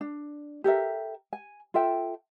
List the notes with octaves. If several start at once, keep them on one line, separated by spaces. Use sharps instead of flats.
D4
G4 A4 A#4 E5
G#5
F4 A4 E5 G5